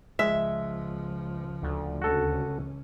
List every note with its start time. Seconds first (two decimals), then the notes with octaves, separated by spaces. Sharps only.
0.19 C#2 F3 G#3 E5
1.63 D2
2.02 C#2 C#4 F#4 A4